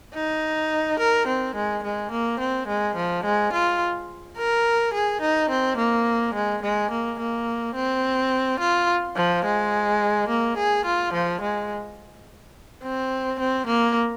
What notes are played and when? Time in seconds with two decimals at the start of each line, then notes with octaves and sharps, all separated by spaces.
0.14 D#4
0.99 A#4
1.27 C4
1.55 G#3
1.83 G#3
2.11 A#3
2.40 C4
2.67 G#3
2.96 F3
3.24 G#3
3.53 F4
4.37 A#4
4.93 G#4
5.21 D#4
5.50 C4
5.77 A#3
6.34 G#3
6.62 G#3
6.91 A#3
7.19 A#3
7.75 C4
8.60 F4
9.16 F3
9.45 G#3
10.29 A#3
10.57 G#4
10.85 F4
11.13 F3
11.41 G#3
12.83 C4
13.39 C4
13.66 A#3